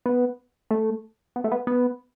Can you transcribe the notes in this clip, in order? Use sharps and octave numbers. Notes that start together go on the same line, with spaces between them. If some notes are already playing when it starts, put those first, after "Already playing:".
B3
A3
B3
A3
B3
B3